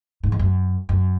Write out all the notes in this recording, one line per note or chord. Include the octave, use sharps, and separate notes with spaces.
G#2
E2
F#2
F#2